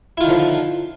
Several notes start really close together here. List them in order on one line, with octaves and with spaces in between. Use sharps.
E4 F4 D#3 D3 F3